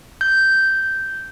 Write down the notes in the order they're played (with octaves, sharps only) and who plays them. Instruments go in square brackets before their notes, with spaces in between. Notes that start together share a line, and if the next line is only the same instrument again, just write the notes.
[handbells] G6